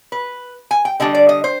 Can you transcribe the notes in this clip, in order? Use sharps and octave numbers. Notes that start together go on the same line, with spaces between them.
B4
G#5
G5
D3 G3 D4 D#5
D5
D#5
C5